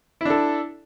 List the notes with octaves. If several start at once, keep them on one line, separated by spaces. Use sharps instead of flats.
D4 E4 A4